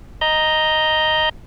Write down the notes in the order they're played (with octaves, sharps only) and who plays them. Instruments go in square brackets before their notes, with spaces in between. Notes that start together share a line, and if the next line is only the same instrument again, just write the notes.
[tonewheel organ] D#5 A#5 G6